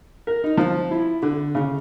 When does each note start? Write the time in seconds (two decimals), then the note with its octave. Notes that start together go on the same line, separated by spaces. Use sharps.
0.27 A#4
0.44 D#4
0.57 F3
0.91 E4
1.22 D3
1.55 C#3